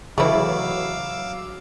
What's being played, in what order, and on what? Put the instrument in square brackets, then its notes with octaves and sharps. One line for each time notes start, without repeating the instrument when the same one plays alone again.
[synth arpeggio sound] C#3 E3 [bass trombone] F#3 [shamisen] A3 E4 [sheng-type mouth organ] F5 D6 E6